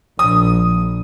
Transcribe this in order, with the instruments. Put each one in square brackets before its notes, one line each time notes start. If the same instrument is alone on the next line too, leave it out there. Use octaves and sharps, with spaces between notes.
[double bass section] A#1 [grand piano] D#6